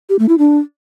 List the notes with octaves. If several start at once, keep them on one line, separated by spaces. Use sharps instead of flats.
G4
A3
E4
D4